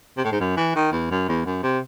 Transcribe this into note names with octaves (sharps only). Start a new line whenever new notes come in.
C3
A2
G#2
F#2
E3
D#3
E2
F#2
E2
F#2
C3